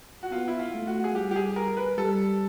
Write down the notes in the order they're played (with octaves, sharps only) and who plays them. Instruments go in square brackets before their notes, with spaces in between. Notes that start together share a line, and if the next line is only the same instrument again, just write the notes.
[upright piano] F#4
[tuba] B3 [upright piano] F4
[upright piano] E4
F4
[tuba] A3
[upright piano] F#4
G#4
[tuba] G3 [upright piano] G4
[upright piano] G4
G#4
A#4
B4
[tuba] G3 [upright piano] A4